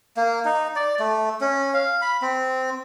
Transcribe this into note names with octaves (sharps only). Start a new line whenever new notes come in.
A#3
D#4
D5
A3
C#4
F5
B5
C4